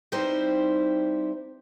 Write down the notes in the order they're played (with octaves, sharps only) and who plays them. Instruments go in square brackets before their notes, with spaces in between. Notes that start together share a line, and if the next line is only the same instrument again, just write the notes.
[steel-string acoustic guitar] G3 C4 D#4 E4 C5